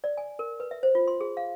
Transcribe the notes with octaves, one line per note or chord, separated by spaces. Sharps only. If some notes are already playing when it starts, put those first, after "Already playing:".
D5
G#5
A#4
B4
E5
C5
F4
C6
G#4
F5